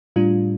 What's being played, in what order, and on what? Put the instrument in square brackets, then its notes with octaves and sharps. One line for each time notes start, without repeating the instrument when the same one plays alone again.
[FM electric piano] A2 G3 D4 F4